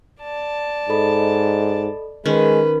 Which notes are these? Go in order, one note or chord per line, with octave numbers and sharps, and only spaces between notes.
D5 A5
G#2 A4 D#5 B5
D#3 G#3 C#4 B4